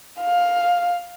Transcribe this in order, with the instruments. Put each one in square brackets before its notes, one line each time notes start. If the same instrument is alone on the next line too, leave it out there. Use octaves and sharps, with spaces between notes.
[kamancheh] F5